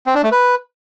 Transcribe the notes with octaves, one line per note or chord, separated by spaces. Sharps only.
C4
D4
A3
B4